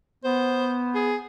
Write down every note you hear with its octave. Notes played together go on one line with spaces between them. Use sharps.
B3 C5
G#4